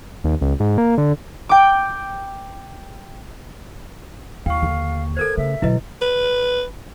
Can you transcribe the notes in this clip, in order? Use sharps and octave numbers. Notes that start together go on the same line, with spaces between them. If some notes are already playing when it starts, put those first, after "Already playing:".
D#2
C#2
G#2
A#3
D3
G5 D6
D#2 E4 F5 G5 C#6
D3 A#3
A4 A#4 C5 G#6
C#3 A3 E5
B2 D3 F#3 E4 B4 D#5
B4